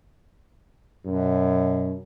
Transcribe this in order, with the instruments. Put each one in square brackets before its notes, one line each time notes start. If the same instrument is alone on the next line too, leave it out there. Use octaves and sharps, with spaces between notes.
[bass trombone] F#2 [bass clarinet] B2